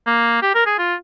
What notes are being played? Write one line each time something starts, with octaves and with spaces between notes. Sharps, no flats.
A#3
G4
A#4
G#4
F4